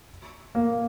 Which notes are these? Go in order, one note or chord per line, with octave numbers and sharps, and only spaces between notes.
A#3